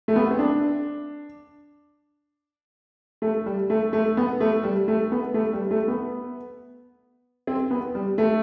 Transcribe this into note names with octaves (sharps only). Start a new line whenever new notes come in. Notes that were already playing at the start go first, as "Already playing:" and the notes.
A3
B3
C4
D4
A3
G3
A3
A3
B3
A3
G3
A3
B3
A3
G3
A3
B3
C4
B3
G3
A3